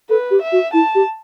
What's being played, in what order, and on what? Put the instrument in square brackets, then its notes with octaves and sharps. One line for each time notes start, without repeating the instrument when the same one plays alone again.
[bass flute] A4 [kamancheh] B4
[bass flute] G4
[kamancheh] E5
[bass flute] F#4
[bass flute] E4 [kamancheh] A5
[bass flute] G4